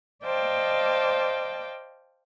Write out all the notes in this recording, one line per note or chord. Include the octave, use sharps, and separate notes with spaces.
C5 D5 D#5 F5 G5 A5